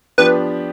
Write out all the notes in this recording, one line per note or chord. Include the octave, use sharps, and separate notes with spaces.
F3 B3 D4 G4 B4